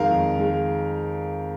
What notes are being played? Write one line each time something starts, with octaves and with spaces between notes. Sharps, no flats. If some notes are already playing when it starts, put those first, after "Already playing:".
Already playing: F2 D#3 G#3 A#4 F5
F2
D#3 G#3